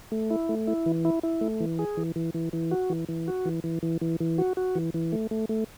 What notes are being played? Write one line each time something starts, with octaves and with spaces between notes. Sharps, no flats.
A3
E4
A3
E4
E3
E4
E4
A3
E3
G#4
E3
E3
E3
E3
F#4
E3
E3
F#4
E3
E3
E3
E3
E3
F#4
F#4
E3
E3
A3
A3
A3